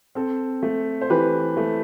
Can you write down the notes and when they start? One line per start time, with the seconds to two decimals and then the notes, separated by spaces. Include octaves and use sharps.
0.15 C4 A4
0.63 A3
1.01 C5
1.10 E3 G4 B4
1.57 A3